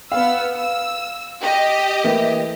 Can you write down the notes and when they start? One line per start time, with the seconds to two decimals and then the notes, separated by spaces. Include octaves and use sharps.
0.12 B3 F5 E6
0.55 E6
1.42 G4 D#5
2.04 E3 A3 A#3